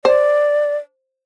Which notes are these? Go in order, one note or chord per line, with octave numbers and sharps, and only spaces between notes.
C5 D5